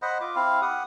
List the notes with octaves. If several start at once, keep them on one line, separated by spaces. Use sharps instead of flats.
C5 D#5 F#5 B5
F4 D6
C4 E4 F5
G4 F#5 D#6